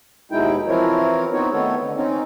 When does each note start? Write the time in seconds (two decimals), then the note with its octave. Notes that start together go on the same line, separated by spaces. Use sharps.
0.32 D#2 B2 G#3 D#4 E4 G5
0.67 E3 F3 C4 E4 A#4 C#5
1.33 B3 C4 D#4 F#4 C#5
1.52 D#3 A3 B3 A4 C#5
1.83 D3
1.96 C4 C#4 D#4